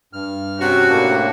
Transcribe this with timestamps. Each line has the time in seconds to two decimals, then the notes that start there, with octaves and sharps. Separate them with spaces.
0.13 G2 F6
0.58 C3 C#4 F#4
0.89 A2 A#3 D4